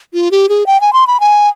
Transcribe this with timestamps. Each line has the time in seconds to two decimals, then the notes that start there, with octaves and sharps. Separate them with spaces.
0.14 F4
0.31 G4
0.49 G#4
0.66 G5
0.81 G#5
0.93 C6
1.07 B5
1.20 G#5